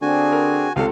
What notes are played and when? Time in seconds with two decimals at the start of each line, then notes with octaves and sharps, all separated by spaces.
0.02 D3 C4 D4 F#4 G#4 G#5
0.32 A#4
0.76 C#2 C3 A4 F5